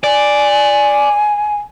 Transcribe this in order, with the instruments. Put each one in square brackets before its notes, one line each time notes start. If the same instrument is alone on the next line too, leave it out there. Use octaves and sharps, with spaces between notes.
[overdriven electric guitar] D5 [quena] G#5